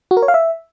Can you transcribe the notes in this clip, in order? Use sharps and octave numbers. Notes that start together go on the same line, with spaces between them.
F#4
A#4
C#5
F5
E5